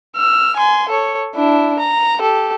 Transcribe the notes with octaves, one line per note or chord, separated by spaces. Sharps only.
E6 F6
G#5 C6
A4 C#5
D4 E4
A#5
G4 A4